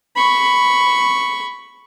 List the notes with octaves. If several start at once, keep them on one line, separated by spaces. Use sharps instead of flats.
B5 C#6